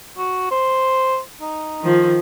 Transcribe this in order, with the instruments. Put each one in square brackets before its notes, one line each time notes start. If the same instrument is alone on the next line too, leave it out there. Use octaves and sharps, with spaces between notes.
[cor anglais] F#4
C5
D#4
[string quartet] D#3 F3